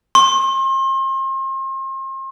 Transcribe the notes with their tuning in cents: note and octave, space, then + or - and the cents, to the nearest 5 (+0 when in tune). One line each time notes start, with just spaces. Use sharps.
C6 +40